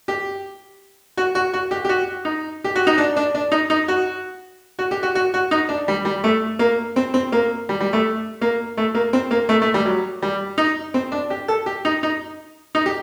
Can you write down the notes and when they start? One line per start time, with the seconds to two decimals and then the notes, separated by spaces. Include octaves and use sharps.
0.08 G4
1.17 F#4
1.35 F#4
1.53 F#4
1.71 G4
1.85 G4
1.89 F#4
2.25 D#4
2.64 G4
2.76 F#4
2.87 D#4
2.98 D4
3.17 D4
3.35 D4
3.52 D#4
3.70 D#4
3.88 F#4
4.79 F#4
4.91 G4
5.03 F#4
5.15 F#4
5.34 F#4
5.51 D#4
5.69 D4
5.88 G3
6.05 G3
6.24 A3
6.59 A#3
6.96 C4
7.14 C4
7.32 A#3
7.69 G3
7.80 G3
7.93 A3
8.41 A#3
8.77 A3
8.95 A#3
9.13 C4
9.31 A#3
9.49 A3
9.62 A3
9.74 G3
9.86 F#3
10.22 G3
10.58 D#4
10.94 C4
11.12 D4
11.30 G4
11.48 A4
11.66 G4
11.85 D#4
12.03 D#4
12.75 D#4
12.86 G4